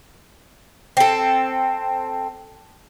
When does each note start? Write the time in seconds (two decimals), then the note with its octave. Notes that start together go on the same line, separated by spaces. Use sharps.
0.97 C4 A4